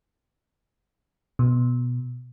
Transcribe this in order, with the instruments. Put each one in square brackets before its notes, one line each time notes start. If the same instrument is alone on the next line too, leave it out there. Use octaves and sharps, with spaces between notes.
[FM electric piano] B2